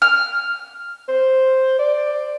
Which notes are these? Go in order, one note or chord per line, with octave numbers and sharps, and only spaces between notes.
F6
C5
D5